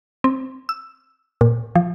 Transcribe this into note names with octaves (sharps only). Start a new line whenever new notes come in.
C4
E6
A#2
F3